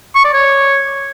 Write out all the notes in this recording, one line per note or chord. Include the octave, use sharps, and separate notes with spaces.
C#6
D5
C#5